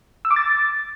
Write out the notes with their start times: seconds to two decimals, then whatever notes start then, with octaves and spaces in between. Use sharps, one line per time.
0.25 E6
0.31 D6
0.36 A6